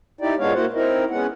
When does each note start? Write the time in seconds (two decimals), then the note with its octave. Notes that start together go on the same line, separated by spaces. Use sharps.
0.21 D#4 E4 G4 D5
0.38 A#2 G#3 B3 D4 C#5 F5
0.54 A#3 E4 F#4 C5 F#5
0.73 C4 D#4 E4 A#4
1.10 G#3 B3 C#4 F#5